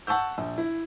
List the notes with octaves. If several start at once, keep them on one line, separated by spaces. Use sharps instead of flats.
F#5 A5 C#6 E6 G6
A#1
E4